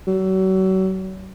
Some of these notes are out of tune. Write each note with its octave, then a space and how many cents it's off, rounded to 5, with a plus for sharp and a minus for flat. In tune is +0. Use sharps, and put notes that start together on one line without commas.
F#3 +35